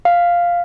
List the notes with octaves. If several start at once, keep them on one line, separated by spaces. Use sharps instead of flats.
F5